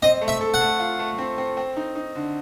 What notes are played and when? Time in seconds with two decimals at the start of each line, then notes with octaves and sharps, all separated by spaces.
0.02 C4 D#5
0.21 A3
0.28 E5
0.41 A4
0.54 F#5
0.61 A3
0.80 F4
0.99 A3
1.18 C4
1.38 C4
1.57 C4
1.76 D#4
1.96 D#4
2.15 D3